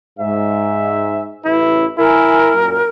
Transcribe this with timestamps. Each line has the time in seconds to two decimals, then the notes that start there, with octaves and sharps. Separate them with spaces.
0.19 G#2 E5
1.45 A1 C#3 E4 B4
1.98 E4 A#4 G#5
2.53 F#2 A#2